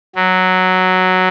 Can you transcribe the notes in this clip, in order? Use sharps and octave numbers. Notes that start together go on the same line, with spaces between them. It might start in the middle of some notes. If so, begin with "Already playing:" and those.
F#3